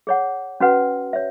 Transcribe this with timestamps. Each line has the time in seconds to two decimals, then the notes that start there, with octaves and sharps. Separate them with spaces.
0.07 G#4 C#5 F#5
0.60 C#4 F#4 B4 F#5
1.13 C#5 E5